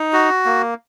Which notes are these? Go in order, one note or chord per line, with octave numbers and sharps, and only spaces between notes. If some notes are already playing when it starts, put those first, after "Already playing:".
Already playing: D#4
F#4
A#3